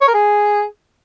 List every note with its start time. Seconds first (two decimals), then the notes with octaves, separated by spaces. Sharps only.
0.01 C#5
0.07 A#4
0.14 G#4